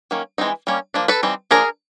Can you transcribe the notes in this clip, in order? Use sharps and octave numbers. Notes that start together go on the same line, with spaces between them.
D#3 F#3 A#3 C#4
E3 G#3 C4 D#4
G3 A#3 C#4
F3 A#3 D4
A4 B4
E3 G3 C4 D#4
F3 A#3 D4 G#4 A#4